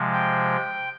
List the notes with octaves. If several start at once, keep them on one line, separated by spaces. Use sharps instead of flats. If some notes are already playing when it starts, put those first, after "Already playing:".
Already playing: C3 F3 G#3
G5